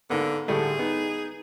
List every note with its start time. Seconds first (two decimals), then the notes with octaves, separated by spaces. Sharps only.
0.10 G#2 D3 A#3 B3
0.48 A2 D3 G3 A3 G#4
0.79 B3 D#4